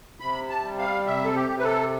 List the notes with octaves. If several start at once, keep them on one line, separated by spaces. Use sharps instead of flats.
C3 B5
A5
G3
F5
C3 E5
A4
G4
C3
B4
A4